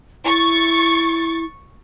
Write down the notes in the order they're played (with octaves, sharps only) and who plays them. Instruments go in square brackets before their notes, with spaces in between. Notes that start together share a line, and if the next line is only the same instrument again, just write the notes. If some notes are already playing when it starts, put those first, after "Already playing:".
[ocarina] E4 [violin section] C#6 A6